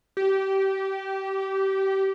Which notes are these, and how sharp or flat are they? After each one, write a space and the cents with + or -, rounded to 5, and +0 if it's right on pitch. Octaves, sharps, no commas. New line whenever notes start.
G4 -25